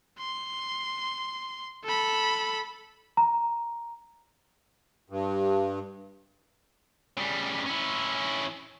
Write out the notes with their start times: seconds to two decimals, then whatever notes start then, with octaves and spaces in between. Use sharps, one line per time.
0.19 C6
1.84 A4 B5
3.17 A#5
5.10 G2
7.17 C#3 G3
7.66 C#4 E4